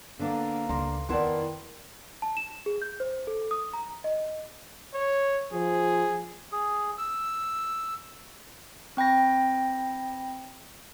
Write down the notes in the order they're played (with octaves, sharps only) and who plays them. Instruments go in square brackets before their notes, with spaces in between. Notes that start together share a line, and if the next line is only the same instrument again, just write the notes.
[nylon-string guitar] D3 B3 D4 [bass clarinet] A#3
[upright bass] C#2 [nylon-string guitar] D4 [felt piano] A#5 C6
[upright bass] F2 [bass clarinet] D#3 [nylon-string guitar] B3 E4 A5 [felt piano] D5 F#5 C6
[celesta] A5
E7
G#4
G6
C5
A4
D#6
A#5
D#5
[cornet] C#5
[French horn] F3 [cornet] G#4
[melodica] G#4
E6
[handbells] C4 G5 B5 A#6